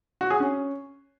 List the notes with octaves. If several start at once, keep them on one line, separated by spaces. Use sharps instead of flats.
F#4
G#4
C#4